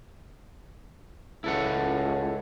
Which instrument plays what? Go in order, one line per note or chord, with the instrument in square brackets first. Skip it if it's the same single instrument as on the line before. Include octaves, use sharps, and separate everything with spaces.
[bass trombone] C#2 [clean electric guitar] E4 A4 F#5